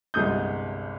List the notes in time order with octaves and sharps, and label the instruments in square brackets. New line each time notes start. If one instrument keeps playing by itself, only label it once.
[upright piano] G1 C2 G#3 D#6 G6